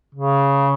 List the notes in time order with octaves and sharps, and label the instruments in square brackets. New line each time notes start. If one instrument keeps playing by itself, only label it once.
[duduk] C#3